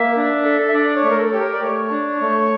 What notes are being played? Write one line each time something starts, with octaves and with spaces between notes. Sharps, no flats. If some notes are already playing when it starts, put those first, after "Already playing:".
Already playing: A#3 E5
D4
A4
E5
D4 D5
C#5
A3
A#4
A4
G4 C#5
A#4
D5
A3 C#5
D4
A3